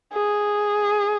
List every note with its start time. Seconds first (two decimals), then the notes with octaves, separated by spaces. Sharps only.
0.13 G#4